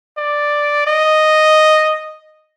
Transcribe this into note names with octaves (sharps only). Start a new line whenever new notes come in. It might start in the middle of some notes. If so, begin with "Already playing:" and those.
D5
D#5